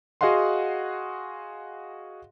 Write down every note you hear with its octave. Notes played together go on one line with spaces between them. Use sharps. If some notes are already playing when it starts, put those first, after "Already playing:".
F#4 G#4 D#5 F5 F#5 C6